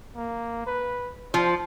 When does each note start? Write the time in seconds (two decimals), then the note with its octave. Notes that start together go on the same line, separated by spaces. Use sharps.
0.16 A#3
0.67 B4
1.34 F3 C5